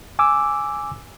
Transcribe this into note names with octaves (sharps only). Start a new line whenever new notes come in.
G#5 D6 E6